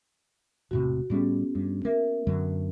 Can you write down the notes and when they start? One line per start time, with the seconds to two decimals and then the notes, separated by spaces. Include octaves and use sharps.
0.71 E1 A2 C3 F#4
1.10 A2 G3 B3 C#4 G#4
1.55 G2
1.85 A#3 A#4 E5
2.27 F#2 D3 F#3